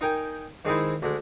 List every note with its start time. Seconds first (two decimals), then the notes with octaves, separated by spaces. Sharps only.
0.01 D#4 A#4 G5 G#5
0.65 D#3 G#3 C4 D#4 E4
1.02 D2 G#3